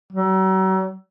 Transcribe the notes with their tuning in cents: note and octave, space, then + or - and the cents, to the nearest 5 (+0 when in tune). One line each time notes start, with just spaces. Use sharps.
F#3 +40